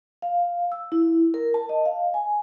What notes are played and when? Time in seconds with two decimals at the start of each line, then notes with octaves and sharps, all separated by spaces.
0.22 F5
0.72 E6
0.92 E4
1.34 A#4
1.54 A5
1.69 D#5
1.85 F5
2.14 G#5